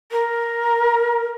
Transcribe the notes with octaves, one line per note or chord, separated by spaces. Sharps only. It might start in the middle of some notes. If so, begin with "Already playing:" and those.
A#4